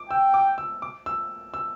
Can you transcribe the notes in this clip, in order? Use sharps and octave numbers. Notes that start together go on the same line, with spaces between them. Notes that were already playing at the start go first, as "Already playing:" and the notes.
Already playing: D6
G5 E6
D6
E6
D6
E6
E6